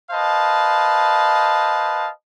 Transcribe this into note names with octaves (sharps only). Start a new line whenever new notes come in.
B4 C5 D#5 F5 A5